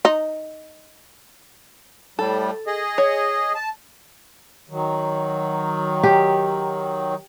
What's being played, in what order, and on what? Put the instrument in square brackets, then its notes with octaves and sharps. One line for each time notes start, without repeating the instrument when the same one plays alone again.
[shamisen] D#4
[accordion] A2 G3 [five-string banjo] A4
[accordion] G#4 D#5
[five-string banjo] C#5
[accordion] A5
[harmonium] D#3 F#3
[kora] G4